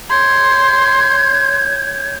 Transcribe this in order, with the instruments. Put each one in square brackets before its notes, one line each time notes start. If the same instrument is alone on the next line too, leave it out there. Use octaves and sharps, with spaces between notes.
[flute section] C#5 G6 G#6 [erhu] C6